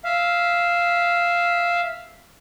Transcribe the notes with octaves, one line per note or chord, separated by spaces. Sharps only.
E5 F5